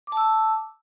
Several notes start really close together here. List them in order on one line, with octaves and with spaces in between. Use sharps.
D6 A5 E6